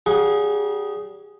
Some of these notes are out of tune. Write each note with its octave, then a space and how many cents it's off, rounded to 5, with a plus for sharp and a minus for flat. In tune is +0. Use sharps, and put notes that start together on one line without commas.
G3 -35 G#4 +0 F#5 -40